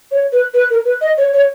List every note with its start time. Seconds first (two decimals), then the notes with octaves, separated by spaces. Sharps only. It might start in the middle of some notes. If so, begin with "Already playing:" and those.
0.11 C#5
0.32 B4
0.53 B4
0.70 A#4
0.84 B4
1.01 D#5
1.17 C#5
1.33 C#5